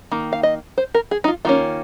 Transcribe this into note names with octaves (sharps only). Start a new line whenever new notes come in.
D#3 A#3
F5
D#5
C5
A#4
G#4
D#4
F4
D#3 A#3 C#4 F4